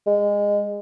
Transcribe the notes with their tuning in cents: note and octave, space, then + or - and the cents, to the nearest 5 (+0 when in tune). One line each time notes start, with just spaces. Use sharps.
G#3 -20